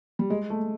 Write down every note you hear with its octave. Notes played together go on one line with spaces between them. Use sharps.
G3
G#3
A3